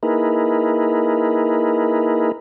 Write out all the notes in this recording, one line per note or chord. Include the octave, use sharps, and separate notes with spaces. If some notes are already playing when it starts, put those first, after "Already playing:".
A#3 D#4 E4 G#4 A#4 B4